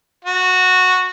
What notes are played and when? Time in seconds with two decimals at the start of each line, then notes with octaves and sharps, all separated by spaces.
0.25 F#4